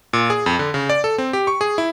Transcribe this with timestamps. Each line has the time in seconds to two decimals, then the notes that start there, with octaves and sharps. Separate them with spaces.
0.13 A#2
0.30 G#4
0.46 F2
0.59 D3
0.74 C#3
0.90 D5
1.04 A4
1.18 C4
1.33 G4
1.47 C#6
1.61 G#4
1.78 E4